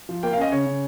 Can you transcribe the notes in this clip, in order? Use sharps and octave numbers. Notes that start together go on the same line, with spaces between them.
F3
A#3 G5
F5
C#4 D#5
C#3 C#5
C#3